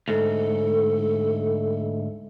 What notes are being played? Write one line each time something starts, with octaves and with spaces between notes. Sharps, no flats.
D2 G#2 A4